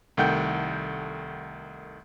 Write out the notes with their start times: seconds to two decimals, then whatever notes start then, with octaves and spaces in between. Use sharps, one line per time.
0.17 C2 D#3 A3 F#5 G5 G6